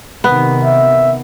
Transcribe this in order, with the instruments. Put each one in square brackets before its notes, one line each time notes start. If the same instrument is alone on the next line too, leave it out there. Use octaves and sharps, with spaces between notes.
[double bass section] C3 D#3 [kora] B3
[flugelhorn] E5